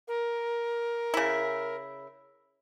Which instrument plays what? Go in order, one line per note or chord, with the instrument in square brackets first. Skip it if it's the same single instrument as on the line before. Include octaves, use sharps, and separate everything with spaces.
[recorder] A#4
[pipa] C#3 E4